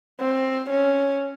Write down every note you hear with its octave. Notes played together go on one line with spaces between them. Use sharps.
C4
C#4